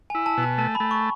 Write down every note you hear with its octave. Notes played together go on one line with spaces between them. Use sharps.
E4 G#5
A5
B2
A5
A3 A5
B5
A3
C#6